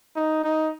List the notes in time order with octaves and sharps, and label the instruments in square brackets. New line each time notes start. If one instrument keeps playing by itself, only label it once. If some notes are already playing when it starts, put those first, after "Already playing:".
[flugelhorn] D#4
D#4